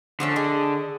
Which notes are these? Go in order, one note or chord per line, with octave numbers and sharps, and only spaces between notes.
D3 F3 A3 C#4
G#4 D#5